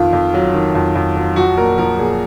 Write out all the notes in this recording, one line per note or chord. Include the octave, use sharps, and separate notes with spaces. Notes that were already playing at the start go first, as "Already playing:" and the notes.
Already playing: F2 D#3 F4
F2
F#3
D#3
F2
F2
F#3
F3 F#4
A#2 A#4
F3 A#4
A#2 G#4